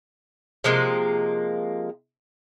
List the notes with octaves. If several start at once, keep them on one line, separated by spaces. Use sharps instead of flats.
C3 F3 G#3 A#3